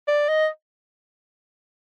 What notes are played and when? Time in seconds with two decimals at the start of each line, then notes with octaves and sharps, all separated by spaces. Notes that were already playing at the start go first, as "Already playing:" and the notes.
0.08 D5
0.29 D#5